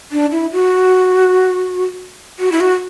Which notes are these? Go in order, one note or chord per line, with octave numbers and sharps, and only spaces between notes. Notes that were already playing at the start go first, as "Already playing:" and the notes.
D4
E4
F#4
F#4
E4
F#4